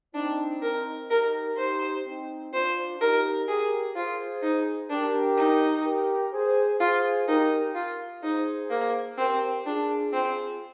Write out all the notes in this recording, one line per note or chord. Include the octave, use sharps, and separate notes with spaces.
C4 D4 D#4
A#4
D#4 G4 A#4
D#4 G4 C5
C4 D#4
D4 F4 C5
D#4 G4 A#4
G4 G#4 A#4
F4 G#4 C5
D#4
D4 G4 A#4
D#4
G4 A#4
G#4 C5
F4 G#4 C5
D#4 G4 A#4
F4
D#4 G#4 C5
A#3
C4 G4 A#4
D4 F4 G#4
C4 F4 G#4